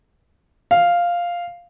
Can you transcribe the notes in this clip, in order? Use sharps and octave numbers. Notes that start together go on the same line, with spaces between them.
F5